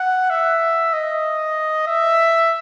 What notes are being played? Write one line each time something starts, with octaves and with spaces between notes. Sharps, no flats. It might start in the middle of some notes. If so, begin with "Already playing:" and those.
Already playing: F#5
E5
D#5
E5